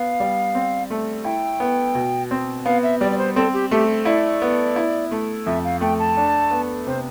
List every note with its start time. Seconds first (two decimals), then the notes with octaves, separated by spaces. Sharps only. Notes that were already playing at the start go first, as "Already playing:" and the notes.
Already playing: B3 F5
0.20 G3
0.55 C4
0.90 A3
1.24 E4 G5
1.60 B3
1.95 B2
2.31 C4
2.65 B3 F5
2.83 E5
3.01 G3 D5
3.11 D5
3.18 C5
3.36 C4 A4
3.53 G4
3.71 A3 G4
4.05 E4 D5
4.42 B3
4.76 E4
5.12 A3
5.46 F2 E5
5.64 F5
5.81 A3 G5
5.99 A5
6.17 D4
6.51 B3
6.87 C3 C5